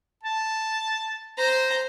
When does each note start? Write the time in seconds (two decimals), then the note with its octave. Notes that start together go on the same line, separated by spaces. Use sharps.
0.23 A5
1.37 C5 A#5